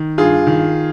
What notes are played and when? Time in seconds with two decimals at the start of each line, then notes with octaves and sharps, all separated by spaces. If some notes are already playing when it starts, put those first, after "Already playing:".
Already playing: D#3
0.18 G2 F4 G#4
0.47 D#3